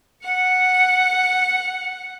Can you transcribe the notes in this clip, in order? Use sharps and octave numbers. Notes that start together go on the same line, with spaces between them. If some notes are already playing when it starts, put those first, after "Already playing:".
F#5 C#7